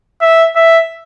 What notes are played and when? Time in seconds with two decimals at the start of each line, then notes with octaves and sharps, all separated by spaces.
0.21 E5
0.56 E5